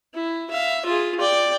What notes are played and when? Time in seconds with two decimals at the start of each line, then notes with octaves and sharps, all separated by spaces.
0.14 E4
0.50 E5 F5
0.85 F4 G#4
1.20 D5 G5